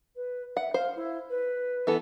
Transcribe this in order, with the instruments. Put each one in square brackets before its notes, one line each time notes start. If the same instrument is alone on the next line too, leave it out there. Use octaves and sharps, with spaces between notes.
[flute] B4
[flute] E5 [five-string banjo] F#5
[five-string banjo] C5 [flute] F5
[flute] E4
B4
[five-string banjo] E3 B3 A4